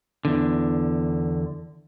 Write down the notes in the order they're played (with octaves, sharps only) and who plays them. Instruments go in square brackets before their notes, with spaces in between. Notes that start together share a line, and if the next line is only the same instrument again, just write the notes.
[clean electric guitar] E2 D3